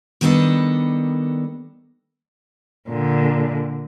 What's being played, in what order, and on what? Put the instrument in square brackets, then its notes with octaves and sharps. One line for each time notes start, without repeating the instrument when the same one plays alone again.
[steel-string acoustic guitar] D#3 G3 B3 D4 A4 D#5
[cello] A#2 D3